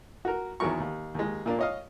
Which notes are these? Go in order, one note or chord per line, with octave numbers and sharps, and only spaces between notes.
F#4 A#4
E2 D#3 F#3 A#4 C#6
D#2
D#2 G#3
A#2 A#3 D4
C#5 D#5 F5